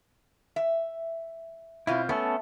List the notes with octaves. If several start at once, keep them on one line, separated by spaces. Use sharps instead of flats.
E5
B2 C4 E4 F4
A3 B3 C#4 A4